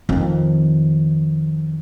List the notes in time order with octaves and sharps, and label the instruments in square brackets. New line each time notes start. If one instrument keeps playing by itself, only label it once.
[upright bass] F2 D#3